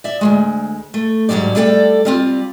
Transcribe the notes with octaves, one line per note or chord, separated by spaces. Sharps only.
D5 E5
D2 C3 G#3
A3
G#2 D3 F#3 G3 D5
G3 A3 A4 D5 F#5 G5
G3 C4 F4